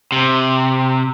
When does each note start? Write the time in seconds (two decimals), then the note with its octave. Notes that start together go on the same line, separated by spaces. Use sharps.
0.12 C3